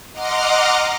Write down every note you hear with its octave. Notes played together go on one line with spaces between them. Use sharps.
D#5 F#5 A#5 C6 D6 F6